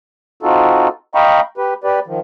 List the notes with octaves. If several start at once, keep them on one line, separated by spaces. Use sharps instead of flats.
C4 D#4 F4 F#4 A4
D#5 F5 G5 A#5 B5 C#6
G4 B4
G4 B4 D5
D#3 F3